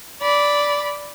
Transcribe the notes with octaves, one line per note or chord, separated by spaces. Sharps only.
D5 B5